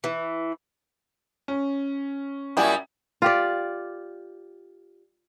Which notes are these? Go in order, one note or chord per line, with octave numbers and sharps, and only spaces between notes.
E3
C#4
A#2 F#3 G3 E4 G4 G#4
F4 G4 D5